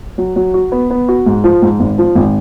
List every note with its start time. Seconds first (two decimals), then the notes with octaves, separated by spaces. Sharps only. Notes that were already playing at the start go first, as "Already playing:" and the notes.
0.18 F#3
0.36 F#3
0.54 F#4
0.72 B3
0.91 B3
1.08 F#4
1.26 G#2
1.44 F3
1.62 G#2
1.80 G#1
1.98 F3
2.15 G#1